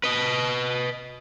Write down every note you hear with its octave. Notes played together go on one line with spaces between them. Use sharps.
B4 D#5